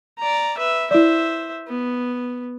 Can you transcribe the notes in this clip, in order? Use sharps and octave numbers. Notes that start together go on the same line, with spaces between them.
D5 A#5
B4 E5
E4 C5 D5 E5
B3